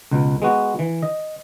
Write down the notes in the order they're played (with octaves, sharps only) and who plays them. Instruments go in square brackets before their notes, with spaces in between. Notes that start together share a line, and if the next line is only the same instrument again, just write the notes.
[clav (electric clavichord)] C#2 B2
G#3 B3 F#4
E3
D#5